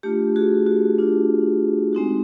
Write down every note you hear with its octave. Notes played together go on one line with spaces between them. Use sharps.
A3 D4 F4 G4
F#4 G#4
F#4
A3 D4 F4
G#3 C4 D#4 F#4